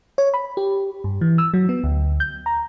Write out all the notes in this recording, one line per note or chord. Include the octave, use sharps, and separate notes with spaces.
C#5
B5
G4
G2
E3
E6
F#3
B3
D2
G6
A#5